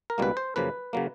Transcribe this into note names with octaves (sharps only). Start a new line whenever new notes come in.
A#4
C#2 B2 G3 A#3 B4
C5
F#2 C#3 F3 A#3 B4
C#3 F#3 A#3